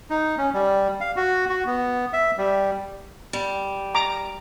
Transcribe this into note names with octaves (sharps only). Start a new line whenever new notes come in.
D#4
C#4
G3
F5
F#4
F#4
B3
E5
G3
G3
A#5 D6